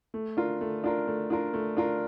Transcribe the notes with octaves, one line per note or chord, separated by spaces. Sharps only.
A3
D4 F4 A#4
A3
D4 F4 A#4
A3
D4 F4 A#4
A3
D4 F4 A#4